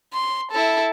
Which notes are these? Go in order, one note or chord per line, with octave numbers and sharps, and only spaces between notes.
C6
E4 A4